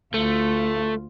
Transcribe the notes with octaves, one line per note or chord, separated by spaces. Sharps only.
D2 A3 F4